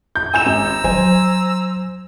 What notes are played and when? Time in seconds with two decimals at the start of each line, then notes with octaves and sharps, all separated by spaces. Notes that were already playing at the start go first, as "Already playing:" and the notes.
0.16 G6
0.34 G#5 A#5 E6 G6 E7
0.46 G#1
0.84 F#3 C5 G#5